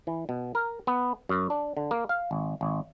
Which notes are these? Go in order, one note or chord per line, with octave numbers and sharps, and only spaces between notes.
E3
B2
A#4
B3
F#2
D4
D3
A#3
F5
G#1
G#1